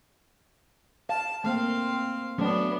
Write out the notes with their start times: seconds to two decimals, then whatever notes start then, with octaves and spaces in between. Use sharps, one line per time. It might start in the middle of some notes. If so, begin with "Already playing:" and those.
1.09 F5 A5
1.44 A3 A#3 C4 F5
2.38 F#3 A3 B3 C#4 D4